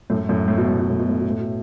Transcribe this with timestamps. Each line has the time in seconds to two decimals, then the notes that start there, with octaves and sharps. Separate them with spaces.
0.10 F#2 A2
0.29 F#2 A2
0.48 A2
0.58 B2
0.68 A2
0.79 B2
0.90 A2
0.99 B2
1.09 A2
1.20 B2
1.30 A2
1.40 B2